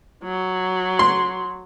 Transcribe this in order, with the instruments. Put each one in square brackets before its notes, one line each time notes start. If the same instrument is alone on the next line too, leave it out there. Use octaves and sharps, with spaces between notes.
[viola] F#3
[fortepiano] C6